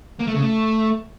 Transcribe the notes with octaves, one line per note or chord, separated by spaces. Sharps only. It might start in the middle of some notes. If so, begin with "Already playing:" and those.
A#3
A3
C#3
A3